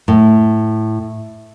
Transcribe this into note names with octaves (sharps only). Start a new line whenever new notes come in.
A2